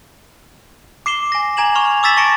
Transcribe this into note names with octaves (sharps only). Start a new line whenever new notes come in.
D6 C7 E7 G7
G#5 A#6
G#5 A#5 G#6 E7 F#7
C#6 F6 G#6 F7
D6 E6 A6 B6 E7 F#7
A5 C#6 A#6 C#7 D7 E7